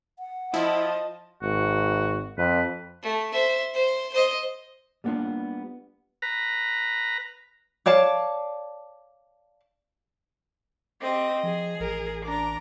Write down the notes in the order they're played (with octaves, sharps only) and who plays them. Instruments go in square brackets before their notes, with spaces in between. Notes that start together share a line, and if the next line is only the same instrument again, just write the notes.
[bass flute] F#5
[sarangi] F3 [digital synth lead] E4 [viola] D#5 A5
[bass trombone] G#1 [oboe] F#4
[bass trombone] F2 [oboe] B4
[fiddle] A3
C5 E5
C5
C5 D#5
[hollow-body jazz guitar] G3 A#3 B3 D4 F4
[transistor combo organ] B4 A#5
[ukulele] C#5 D5 F5 A5
[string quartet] C4 G4 [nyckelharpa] D#5
[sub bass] F3 [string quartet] G#4
[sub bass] A1 [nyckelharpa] A#4
[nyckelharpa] D4 [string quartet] A#5 D6